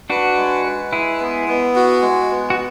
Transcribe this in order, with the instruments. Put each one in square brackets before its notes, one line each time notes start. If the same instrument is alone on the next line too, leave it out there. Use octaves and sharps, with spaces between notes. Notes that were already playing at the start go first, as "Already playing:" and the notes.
[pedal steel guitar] D4 F#4 [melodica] B4
[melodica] G#3
B4
[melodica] G#3 [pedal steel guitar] E4 G#4
[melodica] B3
B3
F#4
G#3
B3
[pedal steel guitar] F#4